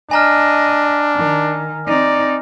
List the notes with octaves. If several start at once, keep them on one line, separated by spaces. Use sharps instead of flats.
D4 D#5 G#5 A#5 F6
D#3
C4 D#4 D5